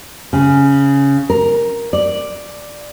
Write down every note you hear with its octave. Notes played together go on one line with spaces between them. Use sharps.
C#3
A#4
D5